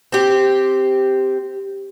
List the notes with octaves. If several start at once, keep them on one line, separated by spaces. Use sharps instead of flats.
C4 G4